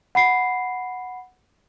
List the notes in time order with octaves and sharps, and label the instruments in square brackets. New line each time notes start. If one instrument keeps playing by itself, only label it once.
[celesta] F#5 B5 C7